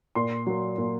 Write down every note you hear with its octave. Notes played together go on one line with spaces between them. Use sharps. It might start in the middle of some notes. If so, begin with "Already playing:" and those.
A#2 C6
F#3 A#3
A#2